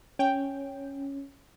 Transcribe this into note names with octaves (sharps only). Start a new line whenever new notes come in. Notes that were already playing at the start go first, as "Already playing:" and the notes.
C#4 G5